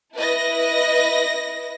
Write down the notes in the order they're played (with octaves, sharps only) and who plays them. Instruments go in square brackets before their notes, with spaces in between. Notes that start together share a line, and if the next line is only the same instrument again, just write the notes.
[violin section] E4 B4 D#5 A#6